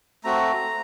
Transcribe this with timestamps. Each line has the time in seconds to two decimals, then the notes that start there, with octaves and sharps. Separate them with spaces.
0.24 A3 C4 F#4 A#5